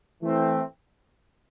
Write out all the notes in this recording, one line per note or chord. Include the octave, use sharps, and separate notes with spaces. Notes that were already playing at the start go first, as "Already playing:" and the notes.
E3 A3 C4